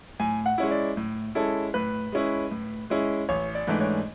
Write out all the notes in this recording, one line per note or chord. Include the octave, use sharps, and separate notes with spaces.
A2 G#5
F#5
G#3 C#4 E4
D5
A2
G#3 C#4 E4 A4
A2 B4
G#3 C#4 E4
A2
G#3 C#4 E4
A1 C#5
D5
G#2 E3 A3 D4
C#5